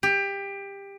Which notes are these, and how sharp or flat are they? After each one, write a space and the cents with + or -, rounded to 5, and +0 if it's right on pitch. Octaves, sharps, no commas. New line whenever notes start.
G4 +20